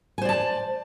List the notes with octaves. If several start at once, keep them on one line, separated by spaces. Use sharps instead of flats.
C5 D5 G#5 A5